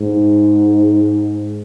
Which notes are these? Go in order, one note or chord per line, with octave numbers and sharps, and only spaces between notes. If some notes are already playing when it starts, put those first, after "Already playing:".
Already playing: G#2